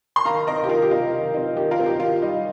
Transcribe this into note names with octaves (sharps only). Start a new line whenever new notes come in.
C6
D#3 F5 A#5
C4 D#4 A#4 D#5
G4
D#3 F4 A#4
G4
C4 D#4 F4
D#3
C4 D#4
D#3 G4
F4 A#4
C4 D#4
G4
D#3 F4
G3 D#4